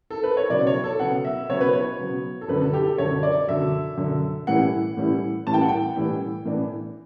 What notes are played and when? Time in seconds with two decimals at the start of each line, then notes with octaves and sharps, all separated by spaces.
0.10 A4
0.24 B4
0.37 C#5
0.50 C#3 F#3 B3 D5
0.67 C#5
0.84 A4
0.99 C#3 F#3 B3 F#5
1.25 E5
1.49 C#3 F#3 B3 C#5
1.61 B4
1.73 C#5
1.99 C#3 F#3 B3
2.41 A4
2.48 F#2 D3 F#3 B4
2.61 A4
2.73 G4
2.86 A4
2.98 F#2 D3 F#3 C#5
3.23 D5
3.48 F#2 D3 F#3 E5
3.97 F#2 D3 F#3
4.47 A2 E3 G3 C#4 E4 F#5
4.97 A2 E3 G3 C#4 E4
5.46 A2 E3 G3 C#4 E4 A5
5.54 G5
5.61 F#5
5.69 G5
5.96 A2 E3 G3 C#4 E4
6.45 A2 E3 B3 D4